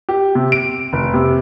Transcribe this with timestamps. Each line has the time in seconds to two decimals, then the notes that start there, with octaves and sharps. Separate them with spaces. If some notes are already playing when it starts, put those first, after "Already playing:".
0.09 G4
0.35 C3
0.52 D7
0.93 F1
1.14 C3